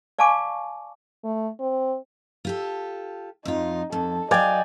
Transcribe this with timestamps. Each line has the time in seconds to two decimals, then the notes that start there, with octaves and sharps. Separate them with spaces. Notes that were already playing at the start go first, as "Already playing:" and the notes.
0.19 D5 F5 G#5 A5 C#6 D6
1.24 A3
1.60 C4
2.45 F4 G4 A4
3.45 F2 D#4 F4
3.92 F2 A4
4.31 F#3 D5 D#5 F5 G5 G#5